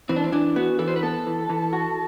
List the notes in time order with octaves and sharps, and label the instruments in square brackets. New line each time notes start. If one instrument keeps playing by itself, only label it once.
[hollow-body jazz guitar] E3 [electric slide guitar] C4
[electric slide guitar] D4
C4
[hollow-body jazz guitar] E3 [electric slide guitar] D4
[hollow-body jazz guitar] B3 [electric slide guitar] F#4
[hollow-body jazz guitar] E3 [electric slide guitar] A4
[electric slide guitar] C5
B4
[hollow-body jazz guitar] B3 [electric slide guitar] A4
[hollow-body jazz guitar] E3
E3
F#4